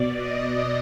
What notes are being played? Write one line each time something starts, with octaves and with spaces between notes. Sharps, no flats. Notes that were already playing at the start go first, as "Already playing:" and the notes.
Already playing: B2 D5
D#5